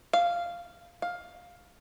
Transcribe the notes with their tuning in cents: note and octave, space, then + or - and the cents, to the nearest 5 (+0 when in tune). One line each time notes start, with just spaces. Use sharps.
F5 -10
F5 +15